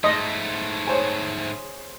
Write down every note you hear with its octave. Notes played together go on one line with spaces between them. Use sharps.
G#2 A3 D#5 C6
G#4 C5 C#5